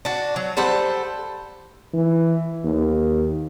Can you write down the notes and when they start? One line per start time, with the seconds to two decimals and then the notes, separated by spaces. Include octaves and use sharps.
0.05 D4 F#4
0.36 F#3
0.57 G3 A4 C5 F#5
1.94 E3
2.64 D#2